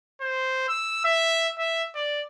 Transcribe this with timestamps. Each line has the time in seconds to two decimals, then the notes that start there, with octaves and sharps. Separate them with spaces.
0.21 C5
0.68 E6
1.04 E5
1.59 E5
1.95 D5